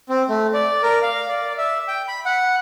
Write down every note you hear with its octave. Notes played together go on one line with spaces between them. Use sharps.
C4
A3
D5
A#4
F5
D5
E5
G5
B5
F#5